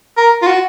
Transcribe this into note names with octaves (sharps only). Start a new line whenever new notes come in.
A#4
F4
F#4